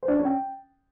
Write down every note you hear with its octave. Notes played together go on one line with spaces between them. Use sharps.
C5
D4
D5
C#4
G5